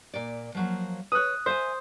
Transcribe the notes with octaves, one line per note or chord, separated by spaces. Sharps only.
A#2 D5
F3 F#3 A#3
B4 C#5 D#6 F#6
C5 E5 F5 G#5